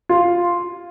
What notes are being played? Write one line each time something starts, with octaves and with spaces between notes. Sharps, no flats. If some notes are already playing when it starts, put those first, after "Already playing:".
F4